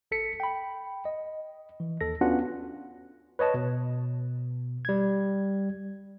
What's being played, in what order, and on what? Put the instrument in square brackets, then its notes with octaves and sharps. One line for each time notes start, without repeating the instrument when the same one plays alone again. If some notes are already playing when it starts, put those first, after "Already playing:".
[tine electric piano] G1 A4 B6 C#7
G5 B5
D#5
E3
D#2 A4 A#6
B3 C#4 D4 F4 F#4 F#5
B4 C#5 D#5 A5
B2
G3 G#6